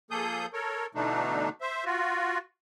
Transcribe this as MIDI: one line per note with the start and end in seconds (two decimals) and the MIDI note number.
0.11 0.46 53
0.11 0.46 58
0.11 0.46 68
0.11 0.46 69
0.11 0.46 87
0.11 0.46 91
0.53 0.86 69
0.53 0.86 70
0.53 0.86 73
0.95 1.49 47
0.95 1.49 50
0.95 1.49 52
0.95 1.49 57
0.95 1.49 62
0.95 1.49 63
1.61 1.84 72
1.61 1.84 76
1.85 2.38 65
1.85 2.38 66